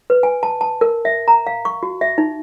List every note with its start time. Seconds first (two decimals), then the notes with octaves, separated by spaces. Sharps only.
0.10 B4
0.23 G#5
0.43 A5
0.61 A5
0.81 A#4
1.05 E5
1.28 A#5
1.47 F5
1.65 C#6
1.83 F#4
2.01 E5
2.18 D#4